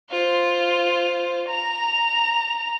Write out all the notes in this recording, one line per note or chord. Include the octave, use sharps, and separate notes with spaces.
F4 C5
A#5 F7